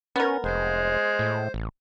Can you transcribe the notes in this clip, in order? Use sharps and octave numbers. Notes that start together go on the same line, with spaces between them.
B3 C#4 A#4
F1 G#3 C5
A2
A1